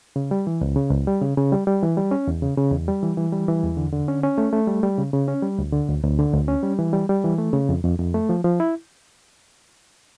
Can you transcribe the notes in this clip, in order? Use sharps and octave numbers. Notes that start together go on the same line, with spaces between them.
C#3
G3
E3
C#2
C#3
C#2
G3
C#3
C#3
G3
G3
E3
G3
C#4
E2
C#3
C#3
E2
G3
E3
E3
G3
E3
E2
D3
D3
C#4
C#4
A3
A3
G3
G3
C#3
C#3
C#4
G3
D2
D3
D2
D2
D3
D2
C#4
G3
E3
G3
G3
E3
A3
C#3
F2
F2
F2
A3
F3
F3
E4